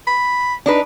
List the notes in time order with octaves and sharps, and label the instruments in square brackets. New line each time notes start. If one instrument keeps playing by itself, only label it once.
[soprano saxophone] B5
[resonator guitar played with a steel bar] D4 D#4 B4